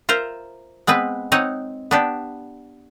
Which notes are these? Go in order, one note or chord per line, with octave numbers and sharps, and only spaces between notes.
F4 A#4 C5 E5
G#3 B3 C4 B4
C4 D#4 C#5 D#5 F#5
B3 D4 G4